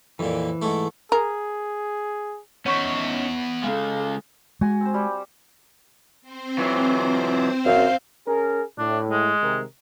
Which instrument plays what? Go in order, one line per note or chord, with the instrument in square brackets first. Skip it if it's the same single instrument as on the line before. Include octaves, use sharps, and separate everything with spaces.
[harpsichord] F2 A#2 [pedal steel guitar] E3
[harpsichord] G#2 A3
[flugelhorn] G#4 [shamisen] A#4
[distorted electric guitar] B3 E5 [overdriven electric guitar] C#4 D#4 [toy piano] C#5 C#6
[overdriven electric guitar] C#3 G#3 [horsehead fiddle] A4 F5
[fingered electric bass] G#3 [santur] F#4 G#5
[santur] C4 C5
G3 G4
[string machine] C4 C5
[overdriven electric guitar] E3 F#3
[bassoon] F#2 [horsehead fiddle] F5
[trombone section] C#4 G#4 A#4
[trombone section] A2 [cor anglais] D4
[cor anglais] G#3
[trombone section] C3 D#3 A#4